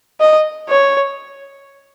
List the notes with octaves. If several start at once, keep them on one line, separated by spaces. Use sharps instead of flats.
D#5
C#5